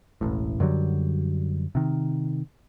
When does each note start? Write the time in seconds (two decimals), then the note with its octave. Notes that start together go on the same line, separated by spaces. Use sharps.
0.21 E1 A1 A2
0.60 F#2 D3 F#3 G3
1.75 C3 D#3